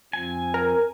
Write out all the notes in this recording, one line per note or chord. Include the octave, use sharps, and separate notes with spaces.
F2 F3 C4 G#5
A#4